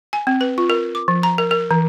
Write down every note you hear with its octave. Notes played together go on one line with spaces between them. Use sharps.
G#5
C4
B4
F4
A#4
D6
F3
A#5
A#4
A#4
E3